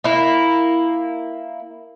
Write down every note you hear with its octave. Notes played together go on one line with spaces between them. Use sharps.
A#3 E4